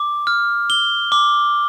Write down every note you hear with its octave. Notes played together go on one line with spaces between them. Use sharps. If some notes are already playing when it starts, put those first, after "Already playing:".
Already playing: D6
F6
G7
D6